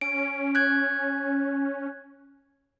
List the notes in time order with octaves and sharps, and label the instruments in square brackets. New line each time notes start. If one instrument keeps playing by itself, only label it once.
[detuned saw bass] C#4 [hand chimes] D7
[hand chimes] F#6 G#6